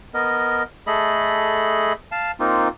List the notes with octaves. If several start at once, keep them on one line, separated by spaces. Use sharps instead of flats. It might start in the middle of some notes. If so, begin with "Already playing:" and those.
B3 A#4 D#5
A3 G#4 A4 D#5 B5
F5 A5
A#3 C4 D#4 F4